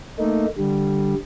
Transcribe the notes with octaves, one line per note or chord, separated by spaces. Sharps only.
A3 A#3 D#4
D3 G3